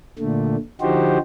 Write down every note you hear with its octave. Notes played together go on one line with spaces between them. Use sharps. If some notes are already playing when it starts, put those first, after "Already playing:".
A#2 D3 A3
D3 F3 D#4 F#4 G4 C5